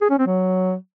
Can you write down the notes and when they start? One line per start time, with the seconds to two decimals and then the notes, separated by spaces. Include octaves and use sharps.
0.02 G#4
0.10 C#4
0.18 C4
0.27 F#3